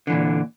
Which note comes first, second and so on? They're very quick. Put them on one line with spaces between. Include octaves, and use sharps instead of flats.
D3 E3 A#2